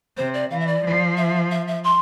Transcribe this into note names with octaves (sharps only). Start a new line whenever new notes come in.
C3 C5
D5
E3 F5
E5
D5
F3
E5
E5
E5
C6